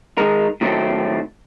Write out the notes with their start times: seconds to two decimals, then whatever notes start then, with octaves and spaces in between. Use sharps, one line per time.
0.18 D#3 G#3 A#4
0.61 A2 D#3 F#3 A3 C4